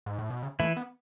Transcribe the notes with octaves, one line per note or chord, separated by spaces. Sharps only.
G#2
A2
B2
C#3
E3 A3 E4
B3